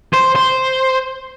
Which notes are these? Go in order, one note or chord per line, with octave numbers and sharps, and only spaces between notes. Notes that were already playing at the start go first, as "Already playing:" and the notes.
C5
C5